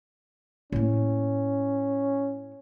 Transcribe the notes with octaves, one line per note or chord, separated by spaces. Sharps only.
A2 A#3 C#4